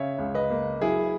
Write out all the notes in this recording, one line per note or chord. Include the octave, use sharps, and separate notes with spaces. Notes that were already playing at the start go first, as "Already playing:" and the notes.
Already playing: C#3 C#5 E5
C#2
B4 D#5
A#3
F#3 E4 G#4